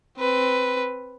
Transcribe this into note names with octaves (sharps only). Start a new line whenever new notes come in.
C4 B4